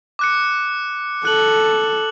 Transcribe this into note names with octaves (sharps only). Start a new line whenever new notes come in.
D6 F#6 C#7
A4 F#6 F#7